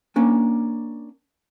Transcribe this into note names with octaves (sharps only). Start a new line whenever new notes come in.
A#3 C#4 D4